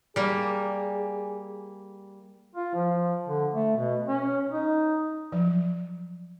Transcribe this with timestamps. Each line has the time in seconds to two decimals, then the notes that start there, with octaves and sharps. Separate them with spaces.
0.16 G3 A#3 G#4
2.55 F4
2.74 F3
3.28 D3
3.54 A3
3.77 B2
4.08 C#4
4.51 D#4
5.32 F3 F#3